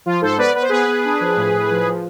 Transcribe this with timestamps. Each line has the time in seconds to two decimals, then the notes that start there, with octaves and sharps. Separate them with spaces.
0.06 F3 F4
0.22 G#2 A4 C5
0.38 B3 B4 D5
0.54 B3 B4
0.62 C5
0.69 B3 G#4 B4
0.87 B3
1.05 D4
1.21 F3
1.37 A2
1.53 A2
1.70 F3
1.87 F3